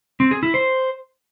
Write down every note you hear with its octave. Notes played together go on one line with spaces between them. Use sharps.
C4
G#4
E4
C5